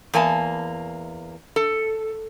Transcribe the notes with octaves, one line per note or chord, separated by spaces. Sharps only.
E2 A#3 G#5 A5
A4